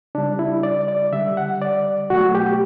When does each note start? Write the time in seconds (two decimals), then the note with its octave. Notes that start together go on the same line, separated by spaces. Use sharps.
0.15 C#3 G3 D4
0.39 E4
0.63 D5
0.88 D5
1.12 D3 G3 E5
1.37 F#5
1.62 D5
2.10 B2 F#3 A3 F#4
2.35 G4